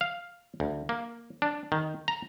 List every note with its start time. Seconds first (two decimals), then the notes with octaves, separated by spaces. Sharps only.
0.01 F5
0.60 D2
0.89 A#3
1.42 D4
1.72 D#3
2.08 A#5